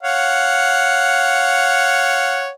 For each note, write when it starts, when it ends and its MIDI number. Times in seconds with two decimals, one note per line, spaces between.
0.03 2.50 73
0.03 2.50 77
0.03 2.50 78